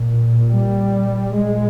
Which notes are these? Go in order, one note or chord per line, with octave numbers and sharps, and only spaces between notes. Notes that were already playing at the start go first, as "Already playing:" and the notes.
Already playing: A#2
G3
A#2 G#3